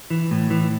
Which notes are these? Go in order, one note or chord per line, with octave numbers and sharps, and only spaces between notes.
E3
A2
E3